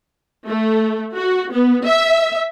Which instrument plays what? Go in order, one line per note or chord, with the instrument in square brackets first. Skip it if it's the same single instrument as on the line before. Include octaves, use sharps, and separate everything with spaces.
[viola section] A3
F#4
B3
E5